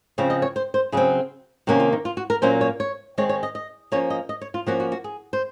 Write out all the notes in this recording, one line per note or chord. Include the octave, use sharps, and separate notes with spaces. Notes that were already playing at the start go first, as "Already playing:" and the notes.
C#3 F3 C4 C#5
D#5
C#5
C5
C5
C#3 F#3 C4 G#4
C3 D#3 A#3 C#4 F#4
F4
D#4
F4
F#4
A#4
A#2 F#3 A#3 C#4 C5
C#5
C#5
D#3 G#3 C4 C#5
C#5
D#5
D#5
F3 A#3 C#4 C#5
D#5
D#5
C#5
F4
F3 A#3 C#4 F#4
F#4
F#4
G#4
C5